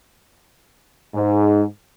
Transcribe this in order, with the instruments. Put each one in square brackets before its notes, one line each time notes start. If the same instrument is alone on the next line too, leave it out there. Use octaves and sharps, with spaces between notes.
[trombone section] G#2